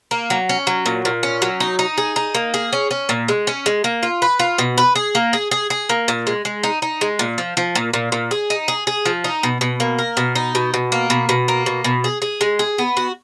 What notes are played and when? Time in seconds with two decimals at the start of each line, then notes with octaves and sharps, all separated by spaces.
0.11 A#3
0.30 F#3
0.49 C#4
0.67 F#3
0.86 A#2
1.05 A#2
1.23 C#4
1.42 F#3
1.60 D#4
1.79 D#4
1.98 G#4
2.16 D#4
2.35 A#3
2.54 G#4
2.73 C#4
2.91 C#4
3.09 A#2
3.28 G#3
3.47 C#4
3.66 G#3
3.84 A#3
4.03 F4
4.22 B4
4.39 F4
4.58 B2
4.78 B4
4.95 G#4
5.15 A#3
5.33 G#4
5.51 G#4
5.70 G#4
5.89 A#3
6.08 A#2
6.27 G#3
6.45 G#3
6.63 D#4
6.82 D#4
7.01 G#3
7.19 A#2
7.38 F3
7.57 F3
7.75 A#2
7.93 A#2
8.12 A#2
8.31 G#4
8.50 D#4
8.68 G#4
8.87 G#4
9.05 F3
9.24 D#4
9.43 B2
9.61 B2
9.80 A#3
9.99 A#4
10.17 B2
10.35 D#4
10.55 B2
10.74 B2
10.92 A#3
11.10 B2
11.29 B2
11.48 A#3
11.66 B2
11.84 B2
12.04 G#4
12.22 G#4
12.41 G#3
12.59 G#4
12.78 B3
12.97 F#4